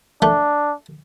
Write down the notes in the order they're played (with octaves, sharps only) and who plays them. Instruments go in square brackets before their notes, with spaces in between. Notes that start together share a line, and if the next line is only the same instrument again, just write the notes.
[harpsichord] A3 [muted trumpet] D4